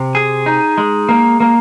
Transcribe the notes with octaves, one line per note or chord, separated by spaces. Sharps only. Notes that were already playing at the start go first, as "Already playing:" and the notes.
Already playing: C3
G#4
D#4
G#3
A#3
A#3